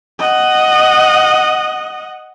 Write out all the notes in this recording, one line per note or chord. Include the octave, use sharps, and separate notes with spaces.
D#5 F#5